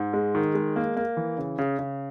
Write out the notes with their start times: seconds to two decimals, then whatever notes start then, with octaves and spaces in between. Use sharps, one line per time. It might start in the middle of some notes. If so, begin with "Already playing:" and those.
Already playing: G#2
0.13 G#3
0.35 D#3
0.55 G#3
0.76 A#3
0.97 A#3
1.17 E3
1.38 C#3
1.59 C#3
1.79 C#3